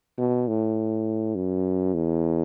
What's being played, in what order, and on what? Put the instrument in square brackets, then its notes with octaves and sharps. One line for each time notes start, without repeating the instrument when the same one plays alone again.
[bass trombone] B2
A2
F#2
E2